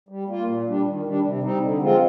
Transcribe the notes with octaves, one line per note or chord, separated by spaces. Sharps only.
G3
A#3 F4
A#2
G3 D4
D#3
G3 D4
C3
G3 C4 D#4
D3
F3 G#3 C4 F4